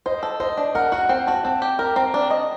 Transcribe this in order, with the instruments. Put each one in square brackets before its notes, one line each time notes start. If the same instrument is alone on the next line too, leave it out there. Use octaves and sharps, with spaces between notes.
[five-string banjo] C5 [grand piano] D#5
[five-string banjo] A4
[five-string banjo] C5 [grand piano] D#5
[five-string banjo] D4
[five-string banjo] A#4 [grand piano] F#5
[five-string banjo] F#4 [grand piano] F#5
[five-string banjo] C4 [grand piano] G5
[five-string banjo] F#4 [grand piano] A5
[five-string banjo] C4 [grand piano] A5
[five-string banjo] G4
[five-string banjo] A#4 [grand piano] A#5
[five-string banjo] C4 [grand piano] A#5
[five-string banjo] D4
D#5